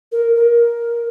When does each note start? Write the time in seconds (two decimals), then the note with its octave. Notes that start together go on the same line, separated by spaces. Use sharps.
0.12 A#4
0.35 A#4